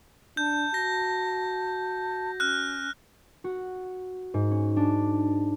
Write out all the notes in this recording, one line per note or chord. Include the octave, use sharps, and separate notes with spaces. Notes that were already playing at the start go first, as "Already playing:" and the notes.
D4 A5 G6
F#4 A#6
C#4 F6 F#6
F#4
G#2
C#4
D4